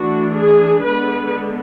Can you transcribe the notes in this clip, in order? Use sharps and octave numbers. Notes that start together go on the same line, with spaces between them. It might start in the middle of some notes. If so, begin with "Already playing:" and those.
Already playing: E3 A3 D4 F#4
G#4
D3 G#3 B3 D4 B4